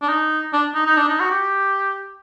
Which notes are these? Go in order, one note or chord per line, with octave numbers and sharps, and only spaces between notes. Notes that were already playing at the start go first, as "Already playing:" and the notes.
D4
D#4
D4
D#4
D#4
D4
D#4
F#4
G4